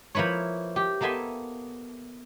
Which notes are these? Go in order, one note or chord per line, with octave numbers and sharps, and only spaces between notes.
F3 A#3 E4 B4 C#5
G4
A#3 B3 A4 E5 G#5 C6